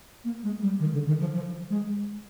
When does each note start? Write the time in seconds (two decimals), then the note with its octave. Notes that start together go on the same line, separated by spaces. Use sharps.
0.24 A#3
0.43 G#3
0.61 G3
0.79 D#3
0.93 D3
1.07 D#3
1.20 F3
1.34 F3
1.70 G#3